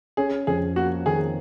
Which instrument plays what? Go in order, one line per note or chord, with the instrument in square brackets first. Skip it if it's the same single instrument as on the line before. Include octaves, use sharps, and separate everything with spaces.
[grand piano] C#4 [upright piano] G#4
[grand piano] F2 [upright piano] G#4
[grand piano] A#3 [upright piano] F#4
[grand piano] D#3 [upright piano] G#4